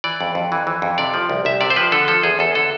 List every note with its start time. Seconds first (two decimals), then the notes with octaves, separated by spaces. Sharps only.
0.04 E3 D5
0.21 F2
0.35 F2
0.52 E3
0.67 E3
0.82 F2
0.98 C3 D5
1.14 F3
1.29 C2
1.45 C2 E5
1.61 C3 D5
1.70 C5
1.76 F3 B4
1.92 D3 A4
2.08 F3 A4
2.23 E2 G#4
2.39 E2 A4
2.55 D3 A4